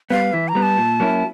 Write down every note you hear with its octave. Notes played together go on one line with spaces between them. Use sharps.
G3 B3 F5
E3 E5
A#5
G3 B3
A5
A#2
F#3 A#3 C#4 E4